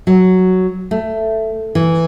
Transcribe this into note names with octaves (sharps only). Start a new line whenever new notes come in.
F#3
A3
E3